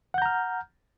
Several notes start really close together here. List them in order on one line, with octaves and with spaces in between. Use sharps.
F#5 G6 A#5 F6